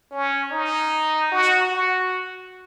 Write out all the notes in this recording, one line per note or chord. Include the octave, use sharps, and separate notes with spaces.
C#4
D#4
F#4
F#4